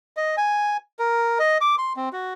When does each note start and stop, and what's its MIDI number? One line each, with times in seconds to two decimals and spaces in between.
0.17 0.36 75
0.37 0.77 80
0.99 1.38 70
1.39 1.58 75
1.61 1.75 86
1.78 1.93 84
1.96 2.09 60
2.13 2.34 66